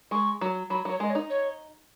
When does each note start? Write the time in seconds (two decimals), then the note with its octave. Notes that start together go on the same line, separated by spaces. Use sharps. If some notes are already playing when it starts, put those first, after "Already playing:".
0.11 G#3 C#6
0.41 F#3
0.70 F#3 B5
0.85 F#3 C#5
1.00 G#3 D#5
1.10 C#5
1.15 D#4
1.30 C#5